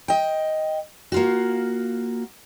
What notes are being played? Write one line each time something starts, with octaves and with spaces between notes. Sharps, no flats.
D#5 G5
A#3 F4 F#4